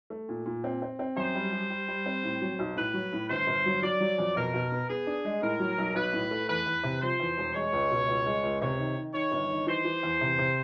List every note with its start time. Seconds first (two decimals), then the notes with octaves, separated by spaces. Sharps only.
0.10 A3
0.29 A#2
0.46 A#2
0.64 C4
0.82 C4
0.99 C4
1.17 F#2 C5
1.35 G3
1.52 G3
1.70 G3
1.88 G3
2.06 C4
2.23 A2
2.41 F#3
2.59 B1
2.76 A2 B4
2.94 F#3
3.13 A2
3.29 G1 C5
3.47 G1
3.66 F#3
3.82 F#3 D5
4.01 F#3
4.18 F2
4.36 B2 A#4
4.54 B2
4.72 B3
4.89 B3 G#4
5.07 D4
5.25 G#3
5.42 A2 A#4
5.59 F#3
5.78 B1
5.95 B1 B4
6.13 A2
6.31 A3
6.49 E2 B4
6.66 E2
6.83 C3
7.02 F3 C5
7.20 E2
7.38 E1
7.54 G#3 C#5
7.73 C#2
7.90 B2
8.09 C#2
8.26 G#3
8.43 C#2
8.61 C3 C#5
8.79 D#3
8.97 D#3
9.14 D#3 C#5
9.32 G1
9.50 D#3
9.67 E3 C5
9.85 E3
10.03 E2
10.21 C3
10.39 C3